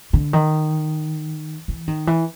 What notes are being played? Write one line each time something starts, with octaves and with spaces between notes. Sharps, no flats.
D3
D#3
E3
D#3
E3